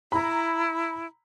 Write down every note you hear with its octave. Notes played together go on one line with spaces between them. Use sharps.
E4 A#5 B5